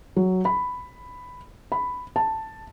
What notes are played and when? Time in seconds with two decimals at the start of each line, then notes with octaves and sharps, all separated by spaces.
0.16 F#3
0.45 B5
1.72 B5
2.16 A5